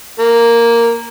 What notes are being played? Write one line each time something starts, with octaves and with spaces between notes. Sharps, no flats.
A#3